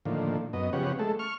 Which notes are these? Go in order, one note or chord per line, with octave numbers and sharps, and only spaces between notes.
A2 D3 D#3 F3 A#3
F#2 B3 D#5
C#3 F3 B3 C#4 G4 F#5
G#3 A3 A4
C#6 F6